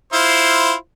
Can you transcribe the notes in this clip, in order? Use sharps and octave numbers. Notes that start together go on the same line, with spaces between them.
E4 F4 C5